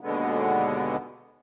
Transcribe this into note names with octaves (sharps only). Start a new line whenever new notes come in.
D#2 B2 D3 G#3 B3